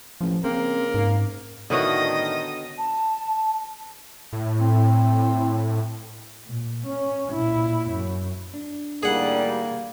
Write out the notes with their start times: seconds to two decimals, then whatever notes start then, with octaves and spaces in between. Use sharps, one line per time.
0.21 A1 F3
0.44 C#3 A#3 C4
0.94 G#2
1.70 A2 D3 D#3 B3 F#4 D#5 D#6 A#6
2.78 A5
4.33 A2
4.59 C4
6.46 A#2
6.86 C#4
7.33 A#2 E4
7.91 F#2
8.54 D4
9.03 A2 D#3 G3 A#3 G#4 F#5